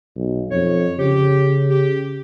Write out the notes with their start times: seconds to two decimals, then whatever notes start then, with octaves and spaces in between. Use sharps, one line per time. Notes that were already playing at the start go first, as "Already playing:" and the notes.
0.16 B1
0.51 F2 C#5
0.99 C#3 G4
1.70 G4